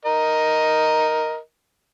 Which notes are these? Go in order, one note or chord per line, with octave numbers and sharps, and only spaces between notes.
A#4 D#5